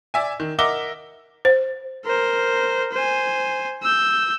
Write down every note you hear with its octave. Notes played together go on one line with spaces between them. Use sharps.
D5 E5 G#5
D#3
A#4 D#5 E5 F#5 D6 G7
C5
A#4 C5
C5 G#5
E6 G6